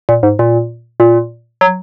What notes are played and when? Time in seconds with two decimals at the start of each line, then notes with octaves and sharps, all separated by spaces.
0.09 A#2
0.23 G#2
0.39 A#2
1.00 A#2
1.61 F#3